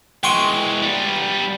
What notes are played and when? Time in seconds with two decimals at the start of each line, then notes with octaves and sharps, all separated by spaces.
0.24 E3 G#3 G5 C6 C#6
0.82 G3 B3